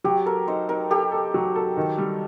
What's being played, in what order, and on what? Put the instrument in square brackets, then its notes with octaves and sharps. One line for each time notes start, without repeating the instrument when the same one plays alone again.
[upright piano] F#3 [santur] G4
[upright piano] A4 [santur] A#4
[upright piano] D#4 [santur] C5
[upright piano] D#4 [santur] A#4
[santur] G4 [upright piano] A4
[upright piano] A4
F#3
A4
D#3
G3